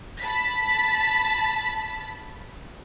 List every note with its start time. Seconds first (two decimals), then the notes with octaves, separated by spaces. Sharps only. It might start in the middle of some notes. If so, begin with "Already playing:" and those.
0.21 A5 B5 B6